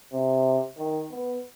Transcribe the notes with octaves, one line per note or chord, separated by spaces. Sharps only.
C3
D#3
B3